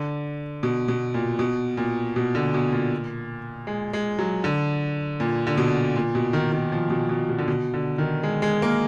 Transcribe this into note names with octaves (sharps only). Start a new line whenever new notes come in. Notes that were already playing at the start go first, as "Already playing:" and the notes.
Already playing: D3
B2
B2
A#2
B2
A#2
B2
D3
B2
A#2
G#3
G#3
F#3
D3
A#2
D3
B2
A#2
B2
D#3
D#3
F3
B2
B2
B2
D3
B2
D3
D#3
G#3
G#3
A#3